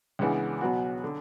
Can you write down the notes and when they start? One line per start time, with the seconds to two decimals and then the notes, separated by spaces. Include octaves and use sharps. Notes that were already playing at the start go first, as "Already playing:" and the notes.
0.19 C#2 C#3 E3 B3 D4
0.61 B2 F#3 B3 F#4
1.04 D3